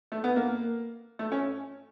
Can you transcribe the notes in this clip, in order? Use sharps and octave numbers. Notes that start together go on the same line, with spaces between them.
A3
B3
A#3
A3
C#4